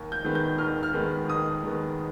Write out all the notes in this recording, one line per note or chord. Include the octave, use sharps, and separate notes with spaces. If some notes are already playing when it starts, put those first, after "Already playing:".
Already playing: D#2
G6
D#3 G#3 B3
G6
D#2 F6
F6
D#3 G#3 B3
D#2 D#6
D#3 G#3 B3